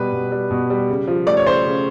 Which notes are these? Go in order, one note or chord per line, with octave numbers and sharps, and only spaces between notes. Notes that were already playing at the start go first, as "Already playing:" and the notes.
Already playing: B2 G3 B4
B2
G3
B2
G3
C#3
F3
A3 D5
C#5
C#3 C5
C#3